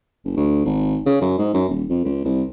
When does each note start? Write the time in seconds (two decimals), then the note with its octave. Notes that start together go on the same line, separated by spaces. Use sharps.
0.24 F#1
0.37 D2
0.65 G#1
1.06 C#3
1.21 F#2
1.38 G#2
1.54 F#2
1.69 D#1
1.89 F2
2.05 C#2
2.25 C2